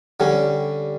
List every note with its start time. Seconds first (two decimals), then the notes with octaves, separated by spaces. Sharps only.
0.20 D3 G3 C#4